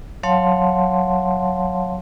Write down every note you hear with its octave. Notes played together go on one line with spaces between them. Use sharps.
F#3 C#5 F5 F#5 A5 C6